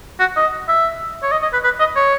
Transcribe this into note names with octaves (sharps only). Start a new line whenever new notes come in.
F#4
D#5
E5
C#5
D#5
D#5
B4
B4
D#5
C#5